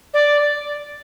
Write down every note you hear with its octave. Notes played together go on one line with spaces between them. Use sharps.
D5